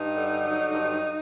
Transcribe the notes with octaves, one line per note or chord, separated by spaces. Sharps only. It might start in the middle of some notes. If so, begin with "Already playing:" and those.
Already playing: G2 D#4
D3
F#3
G2